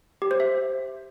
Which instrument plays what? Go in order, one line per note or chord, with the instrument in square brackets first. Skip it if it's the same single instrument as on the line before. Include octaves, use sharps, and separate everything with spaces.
[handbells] G4
C5
E5